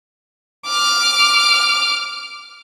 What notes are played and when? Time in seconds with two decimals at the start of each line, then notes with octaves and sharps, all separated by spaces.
0.66 D6 F6